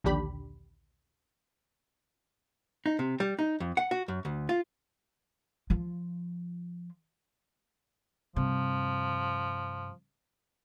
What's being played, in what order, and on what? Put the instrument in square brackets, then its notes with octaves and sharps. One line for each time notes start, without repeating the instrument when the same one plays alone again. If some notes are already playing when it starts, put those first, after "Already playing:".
[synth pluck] A#1 D#2 D3 D4 G4 B5
[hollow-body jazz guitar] D#4
C3
G3
D#4
F2
F#5
F#4
F#2
D2
F4
[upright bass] F3 F4
[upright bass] G2 C3 [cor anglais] F3